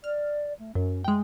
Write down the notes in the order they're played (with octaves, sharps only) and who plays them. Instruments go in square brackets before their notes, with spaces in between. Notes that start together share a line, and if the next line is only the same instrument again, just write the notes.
[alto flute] D5 [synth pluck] F6
[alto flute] A3
[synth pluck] F#2 [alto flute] C#4
[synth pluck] G#3 G5 [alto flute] A3